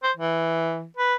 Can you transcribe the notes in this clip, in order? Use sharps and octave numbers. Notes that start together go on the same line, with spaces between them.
C5
E3
B4